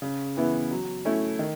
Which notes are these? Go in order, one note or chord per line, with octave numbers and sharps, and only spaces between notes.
C#3
E3 B3 E4
F#3
A3 C#4 E4
D#3